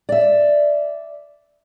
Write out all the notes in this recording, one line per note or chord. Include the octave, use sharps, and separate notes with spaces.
D5 E5